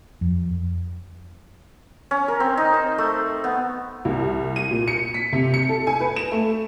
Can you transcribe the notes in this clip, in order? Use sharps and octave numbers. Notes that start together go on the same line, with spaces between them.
F2
C#4
A#4
C4
D#4
C5
A3
B3
C2
D#7
A#2
C#7
B6
C3
C#7
A4
G#5
B4
E7
A3